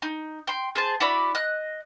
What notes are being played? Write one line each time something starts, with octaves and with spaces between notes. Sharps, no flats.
D#4
G5 C6
G#4 C5 A5
E4 F#4 D5 B5
D#5 F#6